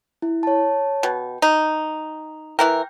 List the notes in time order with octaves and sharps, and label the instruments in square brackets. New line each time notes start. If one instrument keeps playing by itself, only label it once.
[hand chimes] E4
C#5 A5
[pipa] B2 [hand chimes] G5
[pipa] D#4
[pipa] E3 E4 A#4 [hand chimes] G5